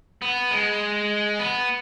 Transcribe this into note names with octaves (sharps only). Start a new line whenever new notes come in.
B3
G#3
B3